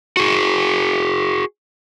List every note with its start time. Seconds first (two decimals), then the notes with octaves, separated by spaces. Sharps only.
0.17 F#4 G#4